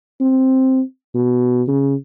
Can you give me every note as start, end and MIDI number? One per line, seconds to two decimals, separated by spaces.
0.21 0.81 60
1.15 1.62 47
1.68 1.95 49